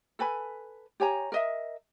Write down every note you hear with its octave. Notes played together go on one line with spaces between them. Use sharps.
A4 B4 G#5 B5
G4 C#5 G#5 A#5
A#4 D#5 E5